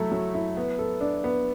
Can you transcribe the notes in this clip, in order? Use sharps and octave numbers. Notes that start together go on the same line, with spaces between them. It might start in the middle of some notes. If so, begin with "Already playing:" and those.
Already playing: F#3 A3 E4 A4
F#3
E4
B3
A4
D4
B3